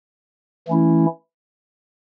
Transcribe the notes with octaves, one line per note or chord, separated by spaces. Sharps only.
E3 A3 C#4 E4